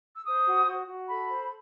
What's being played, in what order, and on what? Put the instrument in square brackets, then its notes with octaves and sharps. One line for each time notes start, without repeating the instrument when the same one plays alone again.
[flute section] E6
C5 D#6
F#4
F#4
F#4
A4 B5
C5